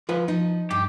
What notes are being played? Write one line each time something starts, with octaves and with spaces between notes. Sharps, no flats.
F3 F4 B4
F3 D#4
G2 G4